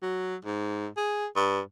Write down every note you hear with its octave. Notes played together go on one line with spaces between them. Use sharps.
F#3
G#2
G#4
G2